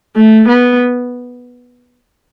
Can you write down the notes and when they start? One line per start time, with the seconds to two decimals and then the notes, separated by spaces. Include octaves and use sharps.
0.16 A3
0.48 B3